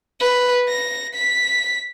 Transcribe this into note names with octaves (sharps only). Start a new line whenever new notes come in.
B4
A#6
B6